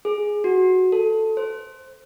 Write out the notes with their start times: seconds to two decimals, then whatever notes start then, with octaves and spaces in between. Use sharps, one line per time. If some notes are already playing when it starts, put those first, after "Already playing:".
0.05 G#4
0.44 F#4
0.92 A4
1.37 C5